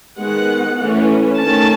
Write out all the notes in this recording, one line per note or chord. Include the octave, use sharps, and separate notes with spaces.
D#3 G#3 B3 F#5
E3 A3 C#4
D#3 A3 C#4 A5